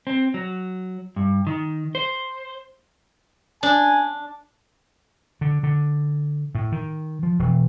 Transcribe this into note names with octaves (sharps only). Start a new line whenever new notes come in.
C4
F#3
G2
D#3
C5
D4 G#5
D3
D3
A2
D#3
F3
E1